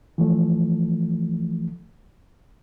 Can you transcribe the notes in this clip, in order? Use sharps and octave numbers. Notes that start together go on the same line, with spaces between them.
E3 F3 A3